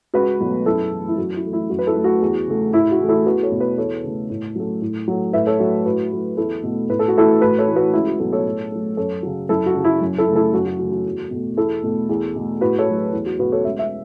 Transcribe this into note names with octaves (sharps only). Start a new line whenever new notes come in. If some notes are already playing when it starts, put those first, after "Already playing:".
C#2 F#4 B4
B2 F#3 A3
F#2 E4 A4
E3 A3
E4
F#2 F#4
E4
E3 A3
E4
F#2 F#4
B4
E4 A4
F#3 A3
F#4
E2
C#3 A3
A2 E4
F#4
E3 A3
E4 A4
E2 F#4 B4
A4 C#5
B2 A3
F#4 B4
E2 A4 C#5
C#3 A3
A2
F#3 A3
A2
F#3 A3
A2 B4 E5
A4 C#5
F#3 A3 F#4
A2 F#4 B4
F#3 A3
E2 E4 A4
B2 A3
A2 B4
A4
F#4
E3 A3 E4 A4
A2 F#4 B4
A4 C#5
E3 A3
F#4 B4
C#2 E4
F#4
B2 F#3 A3 E4 A4
A4 C#5
A2
F#3 A3
F#2 A4 C#5
C#3 F#3
F#2 E4 A4
F#4
C#3 F#3
E4
F#2
E4 A4
C#3 A3
E4 A4
F#2 F#4
F#4
C#3 E3 A3 F#4
F#4
E2
B2 A3
E2 E4 A4
B2 A3
E2
B2 A3
A2 F#4 B4
A4 C#5
F#3 A3
E2
F#4
B2 A3 F#4 B4
A4 C#5
C#2 E5
E5